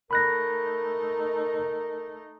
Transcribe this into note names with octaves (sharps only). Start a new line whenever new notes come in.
A3 D#4 A#4 B5 F#6 A#6